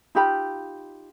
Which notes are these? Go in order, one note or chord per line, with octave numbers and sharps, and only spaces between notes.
D#4 F4 G4 B5